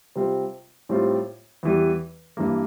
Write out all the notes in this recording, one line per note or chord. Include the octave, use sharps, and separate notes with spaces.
C3 G3 C4 F4
A2 G3 C4 F4
E2 E3 G3
G2 E3 A#3